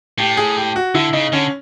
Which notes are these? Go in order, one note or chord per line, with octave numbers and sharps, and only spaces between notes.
A2 G4
G#4
G4
F#4
D3 E4
C#3 D#4
D3 C#4